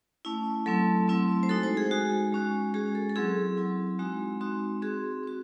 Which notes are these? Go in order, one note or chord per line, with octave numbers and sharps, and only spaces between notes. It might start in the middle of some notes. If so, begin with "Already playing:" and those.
A3 C#4 E4
F#3 A3 C4 E4 A4
F#3 A3 C4 E4
C5
G#3 D#4 F#4 A4
C5
G#4
G#3 D#4 F#4
G#3 C#4 F#4
G#3 C#4 F#4 G#4
A4
A4
F#3 C4 E4 G#4
F#3 C4 E4
G#3 C4 D#4 F#4
G#3 C4 D#4 F#4
C4 F#4 G#4
C4 F#4